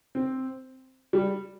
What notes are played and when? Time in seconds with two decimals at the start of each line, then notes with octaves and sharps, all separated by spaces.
0.15 C4
1.13 G3